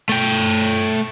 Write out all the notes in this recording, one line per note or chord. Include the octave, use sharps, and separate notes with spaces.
A3 G5